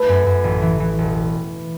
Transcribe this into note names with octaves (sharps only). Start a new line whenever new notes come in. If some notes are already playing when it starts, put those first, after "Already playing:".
Already playing: A3 B4
F#2
F#2
A1
E3
E3
E1